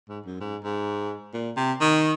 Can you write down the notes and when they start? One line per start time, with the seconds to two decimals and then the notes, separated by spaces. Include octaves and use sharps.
0.09 G#2
0.25 F#2
0.40 G#2
0.64 G#2
1.33 A#2
1.56 C3
1.81 D#3